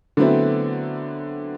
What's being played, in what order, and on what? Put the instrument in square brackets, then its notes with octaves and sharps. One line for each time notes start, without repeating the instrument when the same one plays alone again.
[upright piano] D3 F#3 A3 B3 C4 E4